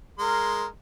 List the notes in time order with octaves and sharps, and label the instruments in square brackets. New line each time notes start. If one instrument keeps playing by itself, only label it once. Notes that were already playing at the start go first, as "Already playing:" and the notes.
[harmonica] G#3 C6 [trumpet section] A#4